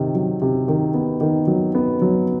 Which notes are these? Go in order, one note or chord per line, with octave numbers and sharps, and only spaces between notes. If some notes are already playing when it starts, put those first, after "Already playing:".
Already playing: C3 D#3
F#3
C3
D#3
B3
D#3
F#3
B3
F#3